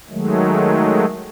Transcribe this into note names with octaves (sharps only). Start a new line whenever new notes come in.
D#3 F#3 G#3 A3